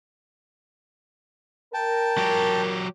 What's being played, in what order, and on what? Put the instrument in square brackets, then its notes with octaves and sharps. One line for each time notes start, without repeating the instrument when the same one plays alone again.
[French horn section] A#4 [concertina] G5 A5
[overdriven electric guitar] F#3 G4